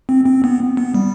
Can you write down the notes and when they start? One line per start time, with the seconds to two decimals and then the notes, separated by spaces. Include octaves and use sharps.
0.09 C4
0.26 C4
0.44 B3
0.77 B3
0.94 G3